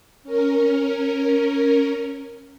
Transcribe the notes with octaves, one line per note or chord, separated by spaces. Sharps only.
C#4 A#4